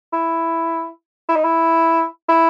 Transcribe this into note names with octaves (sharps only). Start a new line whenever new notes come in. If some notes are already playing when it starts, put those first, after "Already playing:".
E4
E4
D#4
E4
E4